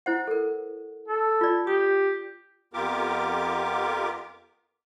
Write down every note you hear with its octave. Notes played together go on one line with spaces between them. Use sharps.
E4 C5 F#5
A4 A#4
A4
F4 D5
G4 D#6
F2 B3 F4 G4 A#4 D6